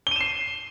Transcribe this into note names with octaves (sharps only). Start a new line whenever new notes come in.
C7 D#7 E7 G7